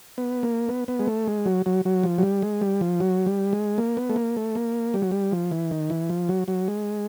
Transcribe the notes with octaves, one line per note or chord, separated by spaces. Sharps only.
B3
A#3
B3
B3
G#3
A3
G#3
F#3
F#3
F#3
F3
F#3
G3
G#3
G3
F3
F#3
G3
G#3
A#3
B3
A3
A#3
A3
A#3
G3
F#3
G3
F3
E3
D#3
E3
F3
F#3
F#3
G#3